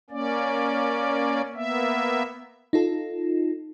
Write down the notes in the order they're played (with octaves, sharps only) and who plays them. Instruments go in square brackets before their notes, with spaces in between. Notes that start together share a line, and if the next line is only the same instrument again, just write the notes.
[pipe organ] A#3 C#4 D5
A#3 B3 E5
[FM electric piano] D#4 F4 A4